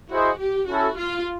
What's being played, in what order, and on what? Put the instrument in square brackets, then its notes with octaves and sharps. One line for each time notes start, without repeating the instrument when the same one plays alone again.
[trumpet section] E4 G#4 C5 D#5 [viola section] F#4
[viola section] G4
[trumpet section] C#4 E4 A4 [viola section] F#4
[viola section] F4